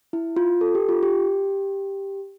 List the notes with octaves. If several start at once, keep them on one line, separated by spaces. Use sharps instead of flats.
E4
F4
A4
G4
F4
G4